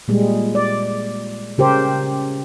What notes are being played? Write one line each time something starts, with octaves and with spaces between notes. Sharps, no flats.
A#2 G3 G#3
D5
C#3 G4 A#4 C5